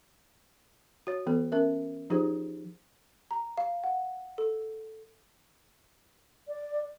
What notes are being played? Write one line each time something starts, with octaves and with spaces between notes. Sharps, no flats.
F#4 C#5
E3 B3 A4
C#4 A#4 E5
F3 D#4 F4 G4 G#4 C5
A#5
F5
F#5
A4
D5